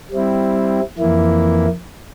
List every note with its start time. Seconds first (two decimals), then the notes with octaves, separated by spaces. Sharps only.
0.11 G3 C4 E4
0.98 F2 E3 A#3 E4